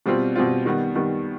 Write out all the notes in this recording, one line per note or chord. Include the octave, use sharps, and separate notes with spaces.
B2 G3 C4 F4
B2 G3 C4 F4
D#3 G3 B3
D#3 G3 B3